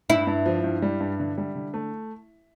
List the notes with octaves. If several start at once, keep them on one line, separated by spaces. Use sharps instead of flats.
G2 E4
G2
F3
G2
G3
G2
D3
G3
D3
A3